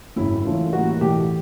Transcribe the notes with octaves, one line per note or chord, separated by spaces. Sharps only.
G#1 F#2 C#3 E4
E3 A3 C#4 F4 A#4
A2 E3 G3 A#3 F#4
B1 A2 E3 A3 G4